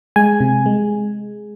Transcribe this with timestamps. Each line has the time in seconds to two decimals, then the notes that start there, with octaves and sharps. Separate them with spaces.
0.16 G#3 G#5
0.40 C3
0.66 G#3